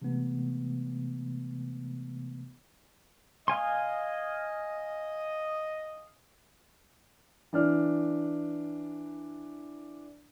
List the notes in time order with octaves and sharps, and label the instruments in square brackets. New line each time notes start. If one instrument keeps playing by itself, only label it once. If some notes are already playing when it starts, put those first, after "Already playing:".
[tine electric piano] C3 E3 G#3 A3 B3
[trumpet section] D#5 [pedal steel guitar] F5 G#5 C6
[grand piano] E3 D4 F6